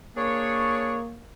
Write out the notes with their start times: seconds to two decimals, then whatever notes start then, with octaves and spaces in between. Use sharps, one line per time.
0.17 A#3 D4 G#4 C#5